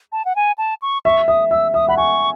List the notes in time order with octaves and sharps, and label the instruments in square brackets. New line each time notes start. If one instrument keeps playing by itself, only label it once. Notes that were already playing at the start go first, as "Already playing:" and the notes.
[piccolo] A5
F#5
G#5
A5
C#6
[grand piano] E5 [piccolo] C#6
[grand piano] E5 [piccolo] D#6
[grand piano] E5 [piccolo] E6
[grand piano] E5 [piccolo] D#6
[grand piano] F#5 [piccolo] B5
[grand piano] G#5 [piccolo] C#6